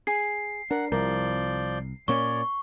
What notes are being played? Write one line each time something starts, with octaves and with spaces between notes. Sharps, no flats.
G#4 C7
D4 A#4 F#5
C2 F3 A#4 D5 G6
A#2 A#3 C#4 C#5 D5 C#6